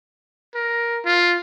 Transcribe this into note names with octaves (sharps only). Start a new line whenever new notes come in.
A#4
F4